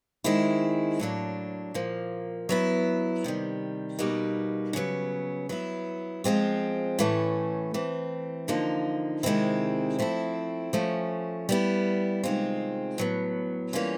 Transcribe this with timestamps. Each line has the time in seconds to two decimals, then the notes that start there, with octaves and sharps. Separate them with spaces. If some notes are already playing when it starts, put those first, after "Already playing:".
0.24 D#3 G#3 C4 E4
1.00 A2 F#3 A#3 D4
1.74 A#2 F3 A#3
2.49 F#3 B3 E4
3.24 C3 D#3 G3
3.99 B2 G3 A#3 D#4 F#4
4.73 C#3 F#3 B3
5.49 F#3 B3 E4
6.24 F3 G#3 C4 F4
6.99 A2 E3 A3 C#4
7.74 E3 A3 C4
8.48 D3 F3 A#3 D#4
9.23 C3 D#3 G#3 C4 E4
9.99 F3 A3 C4 E4
10.73 F3 A3 C#4
11.49 G3 B3 E4
12.23 C3 D#3 G#3 C4 F4
12.98 A2 F#3 B3
13.73 E3 G3 A#3 C#4 F4